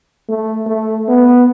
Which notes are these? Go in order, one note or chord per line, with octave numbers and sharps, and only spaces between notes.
A3
A3
B3